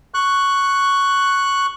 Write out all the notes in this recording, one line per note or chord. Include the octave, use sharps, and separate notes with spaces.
C#6 F#6